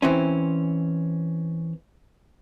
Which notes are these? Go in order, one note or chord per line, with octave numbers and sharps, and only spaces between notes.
E3 C4 C#4